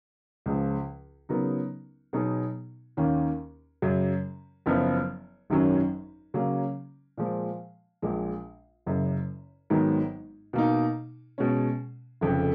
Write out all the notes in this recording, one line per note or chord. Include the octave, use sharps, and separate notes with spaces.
C#2 C#3 F3 G#3
C#3 F#3 B3 D#4 A#4
B2 F#3 B3 D#4 G#4
D#2 D#3 A#3 C#4
F#2 C#3 F#3
F#1 F#2 F3 B3
G#1 F#2 D#3 F#3 C#4
C#3 F#3 A#3 C#4
A#2 F3 G#3
A#1 A#2 G#3
F#1 F#2 C#3
G#1 G#2 D#3 F#3 B3
B2 A#3 D#4
B2 G#3 C#4
F1 F2 C#3